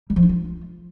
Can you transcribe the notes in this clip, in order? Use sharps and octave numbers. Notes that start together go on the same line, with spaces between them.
G3
F3
D#4
F4